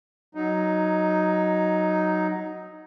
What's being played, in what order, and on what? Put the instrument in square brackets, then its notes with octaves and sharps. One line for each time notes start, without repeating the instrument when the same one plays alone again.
[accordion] F#3 D#4